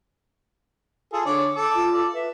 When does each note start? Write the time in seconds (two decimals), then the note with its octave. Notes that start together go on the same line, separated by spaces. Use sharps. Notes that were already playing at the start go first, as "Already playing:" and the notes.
1.13 F4 G#4 A4
1.26 D3 C#5 D5
1.55 A4 D6
1.75 F4
1.93 A4 D5
2.14 B4 E5